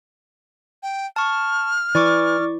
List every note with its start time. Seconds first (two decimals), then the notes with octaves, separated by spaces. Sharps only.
0.83 G5
1.16 A5 C#6 F6
1.95 E3 D5 C#6 D6